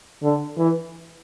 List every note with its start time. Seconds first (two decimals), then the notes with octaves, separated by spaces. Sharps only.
0.23 D3
0.58 E3